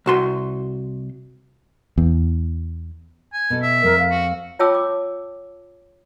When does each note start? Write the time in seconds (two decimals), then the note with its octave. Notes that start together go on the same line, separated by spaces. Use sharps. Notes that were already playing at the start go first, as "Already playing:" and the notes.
0.06 C2 F#4 C6
1.98 E2
3.34 G#5
3.50 B2 A4
3.62 E5
3.83 F2 A3 C4 A#4
3.99 F5
4.11 F#4
4.59 F4 C#5 G5 A5 D6 E6
4.75 D6